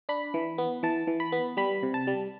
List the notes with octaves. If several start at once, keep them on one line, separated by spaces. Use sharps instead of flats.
D4 B5
E3
B3
E3 A5
E3
B5
B3
G3 B5
C3
A5
G3